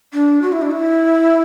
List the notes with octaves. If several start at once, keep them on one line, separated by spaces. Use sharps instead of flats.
D4
F#4
E4
D4
E4